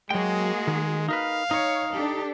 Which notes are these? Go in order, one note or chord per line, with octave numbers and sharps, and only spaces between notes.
F#3 G#3 A#3 F#4 G#4 G5
D#3
D#4 A#4 B4 F5
D#4 C#5
D4 G4 A4